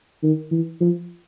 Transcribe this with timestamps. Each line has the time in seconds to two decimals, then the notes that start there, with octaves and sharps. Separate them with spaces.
0.23 D#3
0.51 E3
0.80 F3